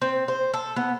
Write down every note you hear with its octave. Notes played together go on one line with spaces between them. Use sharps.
C4
C5
A4
B3